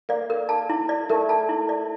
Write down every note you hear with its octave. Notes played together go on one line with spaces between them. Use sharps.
A#3 D5
A#4
A5
E4
D5
A3 A#4
A5
E4
D5